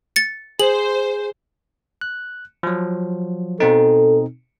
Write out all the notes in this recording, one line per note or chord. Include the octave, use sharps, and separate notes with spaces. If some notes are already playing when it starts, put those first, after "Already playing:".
A6 C#7
G#4 C5 F#7
F#6
F3 F#3
B2 C4 D#4 A4